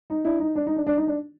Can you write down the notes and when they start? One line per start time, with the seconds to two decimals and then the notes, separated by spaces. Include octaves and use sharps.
0.10 D#4
0.25 D4 E4
0.40 D#4
0.55 D4
0.67 D#4
0.76 D4
0.87 D4
0.97 D#4
1.07 D4